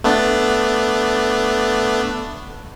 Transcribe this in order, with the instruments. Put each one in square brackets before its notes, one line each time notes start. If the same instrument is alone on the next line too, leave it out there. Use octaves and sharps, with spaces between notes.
[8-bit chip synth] A3 B3 D4